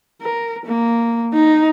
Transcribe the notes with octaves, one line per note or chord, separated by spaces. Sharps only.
A#4
A#3
D#4